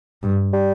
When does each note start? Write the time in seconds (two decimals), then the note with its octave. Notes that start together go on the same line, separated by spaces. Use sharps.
0.23 G2
0.53 G3